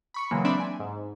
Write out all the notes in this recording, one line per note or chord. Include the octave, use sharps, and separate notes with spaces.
B5 C#6 C#7
C#3 E3 F#3 G#3 A#3
C4 D4 D5 E5 B5 C6
G#5
G#2